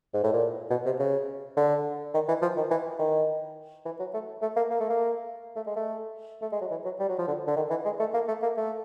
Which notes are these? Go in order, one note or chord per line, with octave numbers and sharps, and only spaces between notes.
G#2
A2
A#2
B2
C3
C#3
D3
D#3
E3
F3
D#3
E3
D#3
E3
F#3
A3
A3
A#3
A#3
A3
A#3
A3
G#3
A3
A3
G#3
F#3
E3
F#3
G3
F#3
F3
D3
D3
D#3
E3
G#3
A3
A#3
A3
A#3
A3